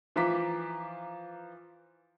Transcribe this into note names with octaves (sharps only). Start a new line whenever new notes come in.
E3 F3 F4 A#5 D6 B6